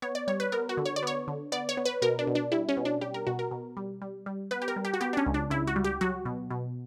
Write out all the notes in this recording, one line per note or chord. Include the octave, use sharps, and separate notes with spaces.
B3 C#5
D5
G3 C#5
B4
B3 A#4
F#4
D3
C#5
D5
B3 C#5
D3
B3 D5
C#5
B3
B4
B2 A#4
D4
B2
D4
G3 E4
C#4
B2
D4
G3 G4
A#4
B2 F#4
A#4
B2
G3
G3
G3
B3 B4
G4
A#4
G3
G4
F#4
B3 G4
D4
C#4
C#2
D4
C#2 E4
F#4
G3
G4
F#3 F#4
B2
B2